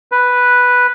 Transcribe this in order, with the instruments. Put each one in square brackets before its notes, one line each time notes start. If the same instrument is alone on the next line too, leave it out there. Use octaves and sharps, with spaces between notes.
[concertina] B4